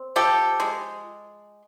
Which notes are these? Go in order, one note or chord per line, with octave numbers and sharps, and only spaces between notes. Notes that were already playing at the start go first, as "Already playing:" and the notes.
Already playing: C4
F3 G4 A4
G#3